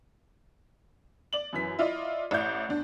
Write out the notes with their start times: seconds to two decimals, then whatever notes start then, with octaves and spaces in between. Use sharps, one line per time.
1.33 D5 F#7
1.53 F#2 E3 B6
1.79 E4 F4 D5 D#5
2.31 A1 E4 D5 G6
2.69 E2 D4